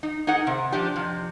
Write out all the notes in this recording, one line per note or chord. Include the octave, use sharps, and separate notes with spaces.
D#4
D#4 G#4 A#4 F#5
C3
F3 D4 G4
F2 C3